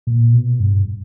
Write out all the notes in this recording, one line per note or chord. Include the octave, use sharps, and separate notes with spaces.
A#2
B2
G2